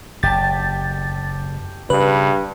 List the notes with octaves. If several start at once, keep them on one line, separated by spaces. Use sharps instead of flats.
F#1 G4 A5 A6
G2 C#3 B4